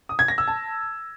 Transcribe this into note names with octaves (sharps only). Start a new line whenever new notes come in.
D#6
G#6
A#6
E6
A5